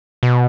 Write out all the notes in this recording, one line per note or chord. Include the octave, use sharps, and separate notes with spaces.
B2